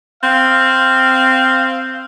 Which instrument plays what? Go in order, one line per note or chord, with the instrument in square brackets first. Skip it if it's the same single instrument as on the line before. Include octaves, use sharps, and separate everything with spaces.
[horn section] C4 F5